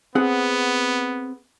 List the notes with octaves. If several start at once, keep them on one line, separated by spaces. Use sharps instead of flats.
B3 C4 G#4 F#5